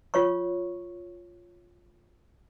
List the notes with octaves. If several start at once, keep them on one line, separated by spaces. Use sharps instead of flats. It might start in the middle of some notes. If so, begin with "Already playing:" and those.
F4 C#5 C#6